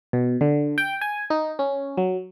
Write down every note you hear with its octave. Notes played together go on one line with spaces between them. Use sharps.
B2
D3
G5
G#5
D#4
C#4
F#3